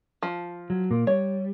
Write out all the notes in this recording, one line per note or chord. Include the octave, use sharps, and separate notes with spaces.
F3
F#3
A#2 A#3
G3 C#5